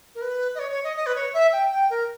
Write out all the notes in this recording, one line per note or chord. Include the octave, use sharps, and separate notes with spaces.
A#4
B4
D#5
C#5
C#5
D#5
D#5
B4
C#5
E5
G5
G5
A#4